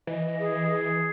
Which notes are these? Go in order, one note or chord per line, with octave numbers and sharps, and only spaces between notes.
E3 D#5
G#4
G#4